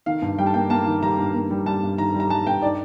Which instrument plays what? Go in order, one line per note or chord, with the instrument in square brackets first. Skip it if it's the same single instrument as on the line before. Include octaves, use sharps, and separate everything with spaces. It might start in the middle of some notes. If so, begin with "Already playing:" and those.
[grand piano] D#3 [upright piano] F5
[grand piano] G2
[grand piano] G3 [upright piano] G5
[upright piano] A5
[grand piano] A#3 [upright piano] G5
[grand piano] A#3 [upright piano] A5
[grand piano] D#3
[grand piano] G3 [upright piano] A#5
[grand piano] G2
A#3
G3
[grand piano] G3 [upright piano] A5
[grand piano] G2
[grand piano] D#3 [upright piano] A#5
[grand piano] G3
[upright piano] A#5
[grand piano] G3 [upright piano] A5
[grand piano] G2 [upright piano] G5
[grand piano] D#4 [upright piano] D5